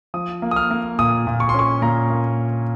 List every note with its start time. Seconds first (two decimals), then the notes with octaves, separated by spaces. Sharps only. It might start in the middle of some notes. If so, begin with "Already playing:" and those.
0.14 F3 D#6
0.42 A#3
0.51 D#6
0.56 F6
0.71 A#3
0.99 A#2 D#6
1.27 A#2
1.40 C#6
1.49 C6
1.54 C#4 C#6
1.82 A#2 A#5
2.10 A#3